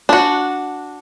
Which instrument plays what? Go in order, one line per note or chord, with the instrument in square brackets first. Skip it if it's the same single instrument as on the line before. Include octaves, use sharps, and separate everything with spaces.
[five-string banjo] D4 F#4